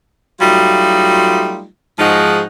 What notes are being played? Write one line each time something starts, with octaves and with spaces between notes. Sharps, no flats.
F#3 G3 A3 D#4 F4
G#2 F3 D#4 F#4 G#4 F#5